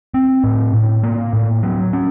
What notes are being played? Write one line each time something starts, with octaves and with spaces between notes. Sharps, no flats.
C4
A2
A2
A#3
A2
F#3
C#4